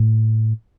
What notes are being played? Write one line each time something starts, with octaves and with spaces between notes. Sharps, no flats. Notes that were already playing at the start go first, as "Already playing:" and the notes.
Already playing: A2